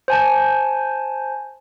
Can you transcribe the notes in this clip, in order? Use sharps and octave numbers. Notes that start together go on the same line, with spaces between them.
C5 G#5 A5